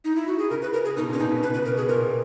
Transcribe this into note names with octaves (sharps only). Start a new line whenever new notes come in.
D#4
E4
F#4
G#4
C#3 A#4
B4
A#4
G#4
B2 D#4
A#2
C#4
B2 D#4
C#3
B2 B4
B4
B2
A#4
B2 G#4
A#2 A#4